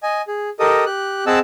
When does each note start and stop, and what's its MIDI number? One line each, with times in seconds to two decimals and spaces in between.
0.03 0.22 75
0.03 0.22 80
0.28 0.50 68
0.60 0.85 67
0.60 0.85 69
0.60 0.85 70
0.60 0.85 75
0.60 0.85 87
0.86 1.25 67
0.86 1.25 90
1.27 1.39 60
1.27 1.39 68
1.27 1.39 75
1.27 1.39 78
1.27 1.39 81
1.27 1.39 88